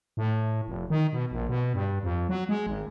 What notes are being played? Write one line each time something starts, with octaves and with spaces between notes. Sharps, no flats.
A2
F1
D#3
B2
A#1
B2
G2
F2
F#3
G#3
G#1